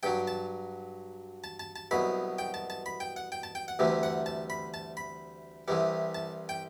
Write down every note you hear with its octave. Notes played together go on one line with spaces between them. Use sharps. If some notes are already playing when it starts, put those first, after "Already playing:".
G2 F#3 G5
A5
A5
A5
A5
C2 B2 F#3 B5
G5
A5
A5
B5
G5
F#5
G5
A5
G5
F#5
D2 C3 E3 G3
F#5
A5
B5
A5
B5
C2 C3 E3 G3
A5
G5